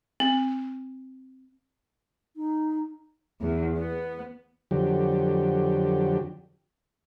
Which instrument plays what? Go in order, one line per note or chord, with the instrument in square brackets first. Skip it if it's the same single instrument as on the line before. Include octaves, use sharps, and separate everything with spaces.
[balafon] C4
[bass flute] D#4
[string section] E2
B3
[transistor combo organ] F2 D3 F#3 G4